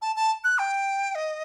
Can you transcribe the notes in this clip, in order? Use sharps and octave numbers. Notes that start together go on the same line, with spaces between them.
A5
A5
F#6
G5
D#5